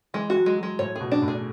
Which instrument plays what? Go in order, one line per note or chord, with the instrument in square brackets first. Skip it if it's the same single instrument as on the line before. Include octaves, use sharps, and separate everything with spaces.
[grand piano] E3 [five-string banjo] G#3
[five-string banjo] F#4
[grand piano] F#3
[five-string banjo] G#3
[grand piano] F#3
[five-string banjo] G#3
[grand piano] A2 [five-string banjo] C#5
[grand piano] B2 [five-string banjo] G#4
[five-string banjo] D4
[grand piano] A2
[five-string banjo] G#4